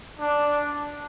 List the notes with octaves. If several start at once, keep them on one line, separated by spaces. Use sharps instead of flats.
D4